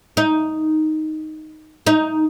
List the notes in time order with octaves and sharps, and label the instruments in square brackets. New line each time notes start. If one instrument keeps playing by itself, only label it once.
[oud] D#4
D#4